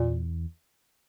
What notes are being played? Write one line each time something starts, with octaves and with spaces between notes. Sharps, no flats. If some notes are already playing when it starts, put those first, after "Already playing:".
Already playing: E2 A#2